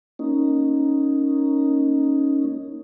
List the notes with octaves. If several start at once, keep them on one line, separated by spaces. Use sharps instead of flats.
A#3 C#4 D#4